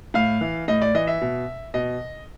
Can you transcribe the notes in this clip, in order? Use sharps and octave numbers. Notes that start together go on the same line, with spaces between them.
A2 F5
E3
A2 D#5
D5
E3 D#5
E5
B2
B2 D#5